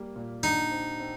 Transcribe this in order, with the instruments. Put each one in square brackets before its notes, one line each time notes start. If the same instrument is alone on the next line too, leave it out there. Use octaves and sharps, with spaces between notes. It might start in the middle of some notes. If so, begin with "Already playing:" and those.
Already playing: [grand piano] G3 A#3
A#2
[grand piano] D3 [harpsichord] D#4
[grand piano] C4
C4